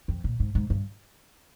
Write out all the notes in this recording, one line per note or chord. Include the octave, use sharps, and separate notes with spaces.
F2
A#2
G#2
G#2
G2